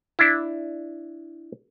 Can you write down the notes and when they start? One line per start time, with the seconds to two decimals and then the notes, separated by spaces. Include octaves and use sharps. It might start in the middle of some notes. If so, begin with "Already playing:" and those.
0.19 D4 E4